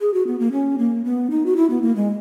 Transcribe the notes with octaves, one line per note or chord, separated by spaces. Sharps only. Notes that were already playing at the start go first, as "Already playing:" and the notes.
G#4
F#4
B3
A#3
C#4
A#3
B3
D#4
F#4
E4
B3
A#3
G#3